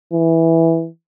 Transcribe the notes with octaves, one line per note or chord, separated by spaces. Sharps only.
E3